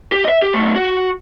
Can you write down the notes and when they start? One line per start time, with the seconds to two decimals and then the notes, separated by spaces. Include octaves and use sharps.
0.12 G4
0.25 D#5 E5
0.42 G4
0.54 B1 A3
0.76 F#4